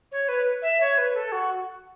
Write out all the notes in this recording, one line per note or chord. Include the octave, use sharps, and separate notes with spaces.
C#5
B4
E5
C#5
B4
A4
F#4